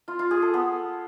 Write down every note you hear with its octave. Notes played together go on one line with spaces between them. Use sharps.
F4
F4
G#4
A4
B3